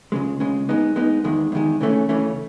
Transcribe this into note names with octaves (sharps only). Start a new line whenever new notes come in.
C#2 C#3 G#3
C#2 C#3 G#3
G#3 B3 D#4
G#3 B3 D#4
E2 D#3 G#3
E2 D#3 G#3
C#3 E3 A3 C#4
C#3 E3 A3 C#4